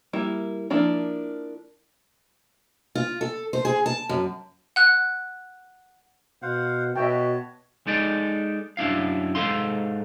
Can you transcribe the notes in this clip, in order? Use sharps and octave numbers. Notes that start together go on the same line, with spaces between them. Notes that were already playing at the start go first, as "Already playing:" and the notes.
G3 A#3 E4
F3 A#3 D4 E4
F4
A4
C5
G#4
A5
F#2
F#5 F#6
B2 C5 F5 F#5
B2 F#4 C#5 E5 G5 A5
G#3 D#4 A4 D5
F#2 D4 E4 F5
G#2 F#3 A4 F5 C6